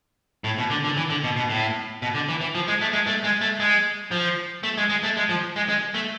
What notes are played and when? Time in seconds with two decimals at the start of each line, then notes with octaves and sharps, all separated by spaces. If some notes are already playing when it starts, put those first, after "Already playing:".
0.44 A2
0.58 B2
0.70 D3
0.85 D3
0.97 E3
1.10 D3
1.24 B2
1.37 B2
1.50 A2
2.02 B2
2.15 D3
2.29 E3
2.41 E3
2.55 F3
2.68 G#3
2.81 A3
2.93 G#3
3.07 A3
3.24 G#3
3.41 A3
3.60 G#3
4.11 F3
4.63 A3
4.77 G#3
4.90 G#3
5.03 A3
5.17 G#3
5.29 F3
5.56 G#3
5.69 G#3
5.94 A3